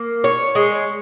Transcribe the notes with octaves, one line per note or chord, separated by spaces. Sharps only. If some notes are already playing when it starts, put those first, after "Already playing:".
Already playing: A#3
C#5
G#3